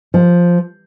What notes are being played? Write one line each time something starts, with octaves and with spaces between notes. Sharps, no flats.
F3